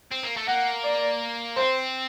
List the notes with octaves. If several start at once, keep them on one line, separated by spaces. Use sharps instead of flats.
C4
A#3
A3
A#3 F#5
D5
C4 C5